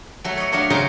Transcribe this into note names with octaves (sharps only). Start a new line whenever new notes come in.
F#3 A3
C#5 D#5
F#3 A3 D4 C#5 F5
C#3 F#3 A#4 C5 D#5 A#5